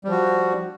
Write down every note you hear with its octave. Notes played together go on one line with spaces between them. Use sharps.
F3 G3 F#4